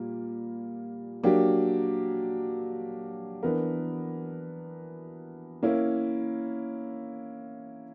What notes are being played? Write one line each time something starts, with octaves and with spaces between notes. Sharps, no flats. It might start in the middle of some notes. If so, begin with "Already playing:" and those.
Already playing: A#2 G3 A#3
F#3 A#3 D4 G4
E3 B3 D4 A#4
A#3 C#4 E4